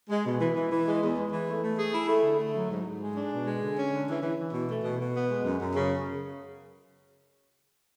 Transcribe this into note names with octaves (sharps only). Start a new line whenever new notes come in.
G#3
B2
E3
E3
E3
G#3
E2
G#3
E3
A3
A3
G#4
E4
A3
D3
A3
F#3
G#2
G#2
G#3
D4
B2
G#3
D3
C#4
D3
E3
E3
E3
B2
A3
B2
B2
B3
G#3
F#2
F#2
C#3